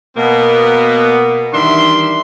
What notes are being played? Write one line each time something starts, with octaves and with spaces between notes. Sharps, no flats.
B2 A#3 B3
D#3 E3 G3 D4 E5 C6